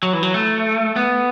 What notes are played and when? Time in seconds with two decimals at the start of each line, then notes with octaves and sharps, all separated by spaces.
0.03 F#3
0.13 E3
0.23 F#3
0.34 A3
0.96 B3